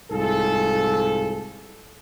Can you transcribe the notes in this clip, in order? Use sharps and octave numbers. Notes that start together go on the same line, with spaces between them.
C2 G#2 F4 G#4 A4